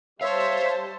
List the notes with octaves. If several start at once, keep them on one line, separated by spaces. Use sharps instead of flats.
G3 C5 C#5 E5 F5 A5